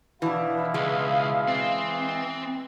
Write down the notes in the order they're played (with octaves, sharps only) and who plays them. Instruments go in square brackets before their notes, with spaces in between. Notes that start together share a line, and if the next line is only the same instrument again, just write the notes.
[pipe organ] B2 E4 [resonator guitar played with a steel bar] E3 D4 [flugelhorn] F5
[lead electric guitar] C#2 [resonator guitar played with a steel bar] G#3
[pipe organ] E3 D#5 A6 [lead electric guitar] C4